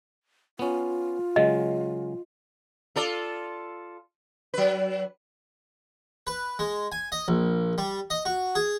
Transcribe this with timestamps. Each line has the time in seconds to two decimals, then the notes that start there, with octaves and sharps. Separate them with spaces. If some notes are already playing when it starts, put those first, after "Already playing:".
0.59 B3 C#4 F4
1.36 C#3 F#3 G#3 D#5
2.96 F4 A4 D5
4.54 F#3 B4
6.27 B4
6.59 G#3
6.92 G#5
7.12 D#5
7.28 A#1
7.78 G3
8.10 D#5
8.25 F#4
8.55 G#4